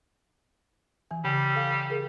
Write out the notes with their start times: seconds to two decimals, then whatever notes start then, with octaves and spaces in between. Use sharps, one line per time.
1.11 E3 G#5
1.24 C#3 G3
1.55 A4 F5
1.90 G#4 A#4